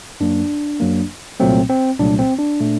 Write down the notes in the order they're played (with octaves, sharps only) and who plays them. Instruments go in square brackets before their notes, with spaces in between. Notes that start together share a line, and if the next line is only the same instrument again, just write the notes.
[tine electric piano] F#2 F#3 A#3 D4
F#2 F#3 A#3
C2 A#2 F#3 A3 C4
C4
C2 A#2 F#3 A3 D4
C4
D4
A#2 A3